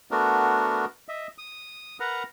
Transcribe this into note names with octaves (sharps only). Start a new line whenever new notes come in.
A3 B3 D4 F#4 A#4
D#5 E5
D#6
A#4 B4 F#5 A#5